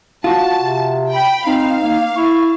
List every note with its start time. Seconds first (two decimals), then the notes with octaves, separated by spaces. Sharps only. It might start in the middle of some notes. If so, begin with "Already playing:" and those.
0.24 F4 F#4 A5
0.57 C3
1.11 G5 B5
1.46 C4 D#4 F5
1.83 A#3
2.16 E4 C#6